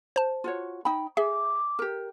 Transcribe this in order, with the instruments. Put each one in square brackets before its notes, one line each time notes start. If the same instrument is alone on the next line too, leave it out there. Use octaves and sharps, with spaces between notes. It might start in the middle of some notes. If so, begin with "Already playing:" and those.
[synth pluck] C5 A5
[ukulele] F4 F#4 C#5
D#4 G5 B5
[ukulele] G#4 [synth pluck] E5 [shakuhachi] D6
[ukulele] G4 A#4